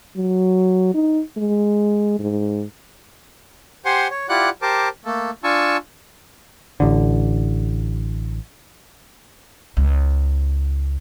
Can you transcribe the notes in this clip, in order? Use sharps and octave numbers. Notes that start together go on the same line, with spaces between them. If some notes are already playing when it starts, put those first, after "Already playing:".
F#3
D#4
G#3
G#2
G4 C5 F#5 G#5 C6
C#5
E4 F4 G4 D5 F#5 F#6
G4 A#4 C5 A5 D6
A3 A#3 A4
D4 F4 G#5 A5 C#6 E6
A1 D3
C#2